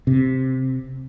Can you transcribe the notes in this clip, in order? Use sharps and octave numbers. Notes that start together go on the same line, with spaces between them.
C3